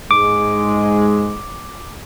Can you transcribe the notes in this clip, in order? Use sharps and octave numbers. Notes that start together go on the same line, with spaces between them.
G#2 G#3 D6